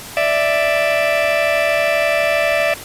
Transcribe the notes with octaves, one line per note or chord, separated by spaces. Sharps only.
D5 E5